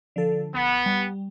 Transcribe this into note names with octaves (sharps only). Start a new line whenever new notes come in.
D3 F3 A4
B1 B3
G3